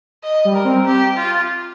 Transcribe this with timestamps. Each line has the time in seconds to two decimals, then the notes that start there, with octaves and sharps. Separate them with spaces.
0.24 D#5
0.45 G3
0.55 A#4
0.65 C4
0.86 G4
1.17 F4